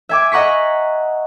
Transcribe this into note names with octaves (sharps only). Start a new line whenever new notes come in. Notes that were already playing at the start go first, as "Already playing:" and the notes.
E5 G#5 D6
D#5 F#5 A#5 C#6 B6